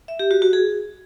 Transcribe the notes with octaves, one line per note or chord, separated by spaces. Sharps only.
E5
G4
F#4
F#4
G#4